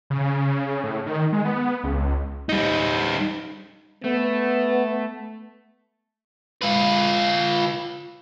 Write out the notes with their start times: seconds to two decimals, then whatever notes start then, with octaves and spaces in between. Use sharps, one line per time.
0.10 C#3
0.84 A2
1.06 D#3
1.32 G#3
1.45 B3
1.84 C#2
2.49 G3 D#4
4.04 A3 B3
6.62 F4 B4